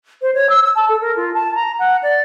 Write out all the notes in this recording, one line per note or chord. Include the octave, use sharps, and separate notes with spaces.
C5
C#5
E6
E6
A5
A4
A#4
F4
A5
A#5
F#5
D5